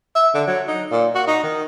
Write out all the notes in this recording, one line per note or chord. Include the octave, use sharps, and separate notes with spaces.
E5
D3
F#3
D#4
A#2
F#4
D#4
D#3